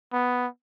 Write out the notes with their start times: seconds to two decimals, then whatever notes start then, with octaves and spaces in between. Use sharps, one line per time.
0.13 B3